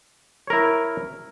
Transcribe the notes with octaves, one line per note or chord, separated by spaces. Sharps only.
E4 A#4 C#5